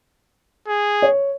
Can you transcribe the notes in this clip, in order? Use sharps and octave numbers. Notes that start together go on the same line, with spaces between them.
G#4
C#5